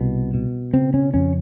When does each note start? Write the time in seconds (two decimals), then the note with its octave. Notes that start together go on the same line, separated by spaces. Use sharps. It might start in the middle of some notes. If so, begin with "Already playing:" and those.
Already playing: C2 B2
0.34 B2
0.74 C#3 C4
0.94 C#4
1.14 F2 C#4